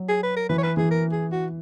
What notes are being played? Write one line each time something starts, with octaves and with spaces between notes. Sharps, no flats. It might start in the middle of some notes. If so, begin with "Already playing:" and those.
Already playing: F#3
G#4
B4
A#4
E3 B4
C#5
B4
E3 G#4
A#4
G#4
F#4